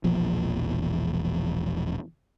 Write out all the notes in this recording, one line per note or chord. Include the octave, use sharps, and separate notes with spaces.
E1 A#1 E2 F3